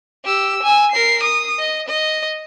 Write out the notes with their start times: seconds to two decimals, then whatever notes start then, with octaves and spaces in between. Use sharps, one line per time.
0.25 G4 E6
0.63 G#5 E6
0.92 A#4 C7
1.23 D#6
1.59 D#5
1.88 D#5